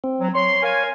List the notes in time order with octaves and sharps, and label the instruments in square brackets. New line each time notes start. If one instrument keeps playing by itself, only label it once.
[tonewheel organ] C4
[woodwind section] F#3
[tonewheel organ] C#5 [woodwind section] C6
[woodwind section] A#4 F5 G#5